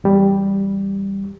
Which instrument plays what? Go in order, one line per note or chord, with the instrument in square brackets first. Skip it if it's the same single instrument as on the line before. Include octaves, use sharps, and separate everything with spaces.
[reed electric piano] E2 G3